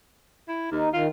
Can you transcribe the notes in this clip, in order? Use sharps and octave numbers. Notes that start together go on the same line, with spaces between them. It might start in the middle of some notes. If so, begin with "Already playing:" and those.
E4
D#2 D#4
D#3 F4